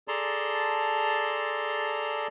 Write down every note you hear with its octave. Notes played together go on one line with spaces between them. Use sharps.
G#4 A4 D5 A5 A#5 C6